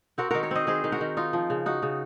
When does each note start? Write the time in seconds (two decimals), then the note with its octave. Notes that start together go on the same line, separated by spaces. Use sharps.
0.18 C4 F#4 A#4
0.31 D#3 F#4 A#4
0.43 A#4 C#5
0.51 C4 C5 D#5
0.67 D#3 G#4 C5
0.84 D#3
0.92 F#4 A#4
1.01 D#3
1.17 D#4 F4
1.33 F3
1.50 C#3
1.66 D#4 F#4
1.82 C#3